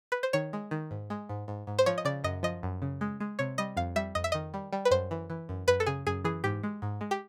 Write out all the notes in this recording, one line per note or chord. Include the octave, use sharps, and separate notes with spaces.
B4
C5
D#3 C#5
G#3
D#3
G#2
G#3
G#2
G#2
G#2
C5
F3 C#5
D#5
C#3 D5
F#2 D#5
F3 D#5
F#2
C#3
G#3
G#3
C3 C#5
G3 D#5
F2 F5
G3 E5
F2 D#5
E5
D#3 D#5
G3
G3
B4
F#2 C5
E3
E3
F#2
F#2 B4
A4
C#3 G#4
F#2 G#4
E3 G#4
G#2 G4
G#3
G#2
G#3
G4